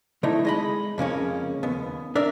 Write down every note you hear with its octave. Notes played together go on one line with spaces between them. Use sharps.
D3 A3 D#4 E4
G#3 D#5 B5
F2 C#3 A#3 C#4
D#2 B3
D4 A#4 D5 E5